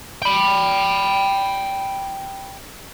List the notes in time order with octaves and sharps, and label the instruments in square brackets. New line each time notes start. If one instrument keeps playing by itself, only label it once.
[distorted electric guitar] G5 B5